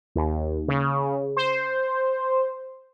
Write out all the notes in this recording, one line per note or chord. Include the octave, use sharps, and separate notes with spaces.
D#2
C#3
C5